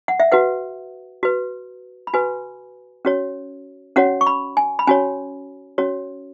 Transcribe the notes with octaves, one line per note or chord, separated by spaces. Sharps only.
F#5
E5
F#4 B4 F#5
F#4 B4
B5
F#4 B4 G#5
C#4 F#4 C#5
C#4 F#4 C#5 F#5
C#6
B5
G#5
B5
C#4 F#4 C#5 G#5
C#4 F#4 C#5